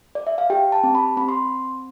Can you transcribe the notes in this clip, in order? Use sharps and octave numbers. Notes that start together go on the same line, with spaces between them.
D5
E5
F5
G4 G5
A5
C4
B5
C4 B5
C6